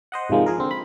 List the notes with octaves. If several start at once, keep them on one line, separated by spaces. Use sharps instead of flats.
C5 D#5 F#5
G#2 C3 D#3 F3 G#3 A#3
F3 G#4 A#4
D3 C4
B5